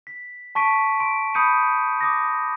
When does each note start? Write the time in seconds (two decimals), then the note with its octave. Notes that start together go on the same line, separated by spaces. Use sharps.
0.07 B6
0.55 A5 C#6 B6 D7 D#7
1.00 C6 D7
1.34 B5 D#6 G6 C#7 D#7
2.01 D6 D#6 A#6